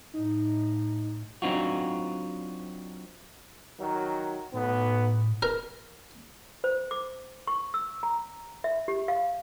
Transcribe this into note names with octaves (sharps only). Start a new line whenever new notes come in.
A2 D#4
F#3 C4 D4 D#4 F4 F#4
D#3 F#3
B1 A2 B3
A#4
C5
D6
C#6
E6
A#5
E5
G4
F5